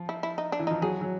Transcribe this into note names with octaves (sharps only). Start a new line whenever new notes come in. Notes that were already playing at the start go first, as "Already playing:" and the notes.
Already playing: F3
E4
E4
D#4
D4
E3
F3 D#4
F#3 G#4
F#3